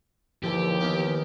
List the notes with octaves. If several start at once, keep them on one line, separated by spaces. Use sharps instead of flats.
D#2 D3 E3 F3 G4
D#3 E3 B3